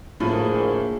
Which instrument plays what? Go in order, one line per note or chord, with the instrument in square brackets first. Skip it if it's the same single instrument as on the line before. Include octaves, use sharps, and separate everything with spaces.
[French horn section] D2 A#3 C5 [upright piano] A2 F3 [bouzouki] G#4